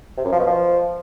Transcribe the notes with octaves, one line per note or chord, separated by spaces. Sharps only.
C3
F#2
F3
B2
F3